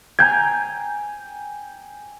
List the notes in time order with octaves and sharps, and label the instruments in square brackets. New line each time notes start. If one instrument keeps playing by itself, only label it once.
[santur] G5 G#5 A#5 [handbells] G6 G#6